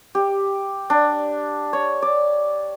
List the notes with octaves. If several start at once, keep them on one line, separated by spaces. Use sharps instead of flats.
G4
D4
C#5
D5